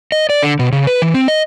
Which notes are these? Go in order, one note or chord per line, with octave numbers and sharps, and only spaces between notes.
D#5
D5
D3
B2
C#3
B4
E3
C4
D#5